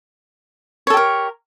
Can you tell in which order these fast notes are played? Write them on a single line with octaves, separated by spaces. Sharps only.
C#5 A4 G4 A#4